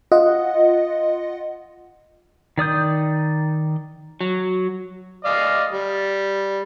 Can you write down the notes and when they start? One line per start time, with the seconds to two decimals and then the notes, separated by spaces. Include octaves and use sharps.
0.12 F4 D#5 F#5
2.58 D#3 D5 D#6 G6
4.21 F#3
5.25 D5 D#5 F5
5.72 G3